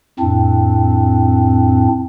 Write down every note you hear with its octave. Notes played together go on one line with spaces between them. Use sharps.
F2 A2 C4 D4